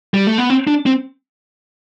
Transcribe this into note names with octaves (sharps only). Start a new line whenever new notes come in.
G3
A3
B3
C4
D4
C4